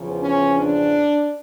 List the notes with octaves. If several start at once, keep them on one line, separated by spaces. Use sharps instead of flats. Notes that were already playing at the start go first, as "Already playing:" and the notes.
Already playing: E2 C#3 F3
C#4
D4